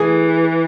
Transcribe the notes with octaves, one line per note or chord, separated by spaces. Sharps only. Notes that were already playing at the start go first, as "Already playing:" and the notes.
Already playing: E3 G#4